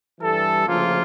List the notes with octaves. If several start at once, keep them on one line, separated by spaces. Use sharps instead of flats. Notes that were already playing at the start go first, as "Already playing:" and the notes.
G2 E3 G3 A4
D2 C#3 F3 A#3 F4